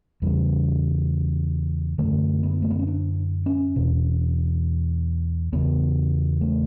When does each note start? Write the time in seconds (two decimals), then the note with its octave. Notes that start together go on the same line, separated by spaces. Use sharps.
0.22 E2 C#3 G3
1.98 F#2 D3 A3
2.43 B3
2.62 A3
2.70 B3
2.79 C#4
2.87 D4
3.46 C#4
3.76 E2 B2
5.53 E2 C#3 B3
6.41 A3